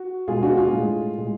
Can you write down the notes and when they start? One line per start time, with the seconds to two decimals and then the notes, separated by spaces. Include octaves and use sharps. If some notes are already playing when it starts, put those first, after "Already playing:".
Already playing: F#4
0.28 B2 G#3 F4 G#4
0.43 D4 F#4
0.57 F4 G#4
0.72 A2 G#3
1.18 A2 G#3